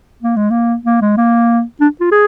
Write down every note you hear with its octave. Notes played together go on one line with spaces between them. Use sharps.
A#3
G#3
A#3
A#3
G#3
A#3
D4
F4
G#4